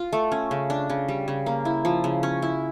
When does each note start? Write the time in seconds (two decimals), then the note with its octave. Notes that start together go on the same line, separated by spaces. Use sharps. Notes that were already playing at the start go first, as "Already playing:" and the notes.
Already playing: F4
0.13 A3
0.32 C#4
0.51 C#3
0.70 D4
0.90 C#3
1.08 G3
1.28 C#3
1.46 A#3
1.65 E4
1.85 F3
2.04 C#3
2.23 C#4
2.42 E4